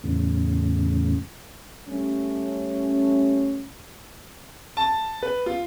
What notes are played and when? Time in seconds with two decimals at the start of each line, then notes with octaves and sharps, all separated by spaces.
0.04 E2 A2 C#3
1.89 G3 A3 C#4
4.77 A5
5.22 B4
5.46 F4